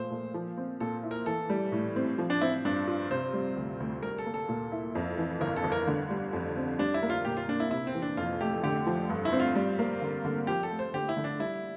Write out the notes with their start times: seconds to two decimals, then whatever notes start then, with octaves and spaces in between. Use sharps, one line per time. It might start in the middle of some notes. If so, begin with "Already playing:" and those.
Already playing: A#2 F3 A3 C5
0.11 A#2
0.34 F3
0.57 C4
0.80 A#2 A4
1.03 E4
1.11 A#4
1.26 E3 A4
1.50 G3
1.72 A2
1.96 C4
2.18 F3
2.30 D4
2.41 C4 E4
2.65 G2 D4
2.88 F4
3.11 C3 C5
3.33 G3
3.57 D2
3.80 D2
4.03 G3 A#4
4.18 A4
4.26 A#3
4.34 A4
4.49 A#2
4.72 E4
4.95 F2
5.18 E3
5.41 G1 A#4
5.56 A4
5.64 G1
5.72 A#4
5.87 D3
6.10 G3
6.33 F2
6.56 C4
6.79 G3 D4
6.94 E4
7.02 A#3
7.10 F4
7.25 A#2 G4
7.37 F4
7.48 A#2 D4
7.60 E4
7.71 C3 E4
7.87 C4
7.94 E3
8.02 D4
8.17 F2 F4
8.41 A3 G4
8.63 D3 G4
8.86 F3
9.09 G2
9.25 E4
9.33 C4
9.40 F4
9.55 G3
9.79 A#3
10.02 D3
10.25 D3
10.47 F3 G4
10.63 A4
10.71 A3
10.79 C5
10.94 D3 G4
11.09 E4
11.17 D3
11.24 D4
11.40 G3 E4